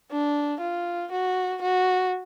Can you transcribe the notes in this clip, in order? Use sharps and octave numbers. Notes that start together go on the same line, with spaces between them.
D4
F4
F#4
F#4